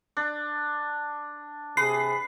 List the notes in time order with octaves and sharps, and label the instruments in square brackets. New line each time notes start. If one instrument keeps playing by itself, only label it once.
[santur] D4
[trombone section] C3 G#4 [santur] B4 [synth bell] C7